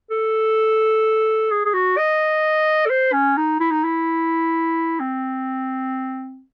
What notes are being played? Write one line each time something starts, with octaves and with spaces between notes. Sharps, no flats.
A4
G#4
G#4
F#4
D#5
A4
C5
C#4
D#4
E4
D#4
E4
C4